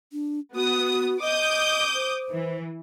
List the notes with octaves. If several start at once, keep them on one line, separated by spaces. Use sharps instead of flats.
D4
B3 F#4 D#6
D#5 D6 D#6 G6
C5
E3